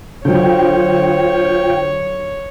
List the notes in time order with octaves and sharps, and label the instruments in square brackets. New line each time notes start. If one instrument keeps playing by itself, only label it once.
[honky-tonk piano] D3 F#3 [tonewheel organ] F4 G5 [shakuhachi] C5 [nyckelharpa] C#5